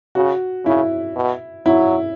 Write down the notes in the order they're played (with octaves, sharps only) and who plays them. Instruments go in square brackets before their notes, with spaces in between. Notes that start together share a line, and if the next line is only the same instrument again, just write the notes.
[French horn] C#3 [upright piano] F#4
[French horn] C#3 [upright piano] E4
[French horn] B2
[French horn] F#3 [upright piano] E4